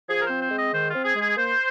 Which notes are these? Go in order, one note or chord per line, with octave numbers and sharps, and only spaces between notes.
F3 G#4
A#4
C4 C5
C5
G#3
D#5
D#3 C5
C4 F4
G#4
G#3
G#4
A#3 C5